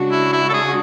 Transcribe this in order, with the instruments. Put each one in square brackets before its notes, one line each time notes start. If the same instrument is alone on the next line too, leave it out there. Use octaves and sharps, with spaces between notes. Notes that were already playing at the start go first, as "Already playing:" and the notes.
Already playing: [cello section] C#3 G#3 D4 F#4
[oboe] E4
E4
A4
G#4